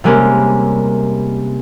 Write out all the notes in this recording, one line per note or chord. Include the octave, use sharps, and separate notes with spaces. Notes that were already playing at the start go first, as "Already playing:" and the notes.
C3 G3 G#3 A#3 C#4